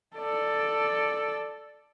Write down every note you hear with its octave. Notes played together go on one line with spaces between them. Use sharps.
A4 D5